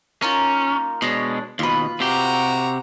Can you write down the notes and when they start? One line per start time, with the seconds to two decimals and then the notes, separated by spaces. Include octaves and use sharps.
0.22 A#3 C#4 D#4 F4
1.02 B2 G#3 D4 C#5
1.59 D#2 B2 F4 B4
2.00 C3 F#4 G4 A#5